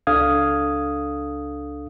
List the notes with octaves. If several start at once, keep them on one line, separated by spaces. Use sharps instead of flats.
C#2 D4 A4 F5 D#6 G#6